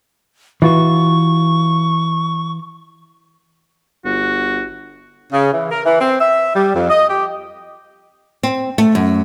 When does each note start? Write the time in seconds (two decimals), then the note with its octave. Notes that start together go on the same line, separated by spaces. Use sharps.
0.62 E3 F4 F#4 C#6
4.05 G1 F#4
5.33 C#3
5.53 E3
5.72 A#4
5.85 E3
6.01 C4
6.21 E5
6.56 G3
6.75 F2
6.90 D#5
7.09 G4
8.43 C4
8.78 A3
8.95 F#2